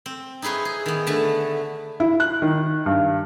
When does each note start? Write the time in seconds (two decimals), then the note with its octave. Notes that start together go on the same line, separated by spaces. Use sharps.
0.06 C4
0.42 D#4 E4 G#4 B4 C#5
0.65 G#4
0.86 D#3 B3
1.07 D3 A3 B4 G#5 A5
2.00 E4
2.20 F#6
2.42 D#3
2.86 G2